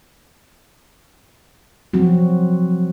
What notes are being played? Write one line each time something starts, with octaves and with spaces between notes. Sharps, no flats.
F3 F#3 C4 F#4